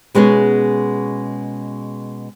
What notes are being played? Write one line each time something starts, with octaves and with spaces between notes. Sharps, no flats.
B2 G#3 B3 C#4 G#4